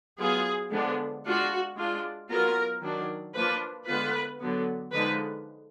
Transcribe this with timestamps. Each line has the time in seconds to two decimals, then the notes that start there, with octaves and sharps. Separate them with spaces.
0.19 F#3 B3 F4 G#4
0.72 D3 F3 G#3 B3 D4
1.25 G#3 D4 F4 F#4
1.77 G#3 D4 F4
2.30 F#3 B3 F4 A#4
2.83 D#3 F#3 D4
3.35 F3 A#3 D4 F4 B4
3.88 D3 G#3 B3 F4 B4
4.41 D3 F#3 B3
4.93 D3 F3 G#3 D#4 B4